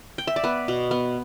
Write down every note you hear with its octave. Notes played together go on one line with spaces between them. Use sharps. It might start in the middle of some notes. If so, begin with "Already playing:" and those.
G5
E5
D5
B3 B4
B2
B3